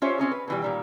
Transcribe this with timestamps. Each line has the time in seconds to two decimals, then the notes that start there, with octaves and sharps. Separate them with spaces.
0.02 C#4 F4 G4 C5 C#5 E5
0.18 C4 C#4 D#4 G#4
0.31 B4
0.48 B2 E3 G3
0.62 A#2 D#3 G3